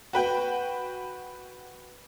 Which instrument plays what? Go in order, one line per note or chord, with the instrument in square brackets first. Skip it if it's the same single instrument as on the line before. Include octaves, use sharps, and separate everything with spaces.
[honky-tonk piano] F#4 B4 G5